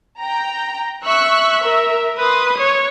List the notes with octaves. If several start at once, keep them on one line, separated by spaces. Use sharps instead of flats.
G5 A#5
E5 C#6 E6 F#6
A#4
B4 C6 D#6
C#5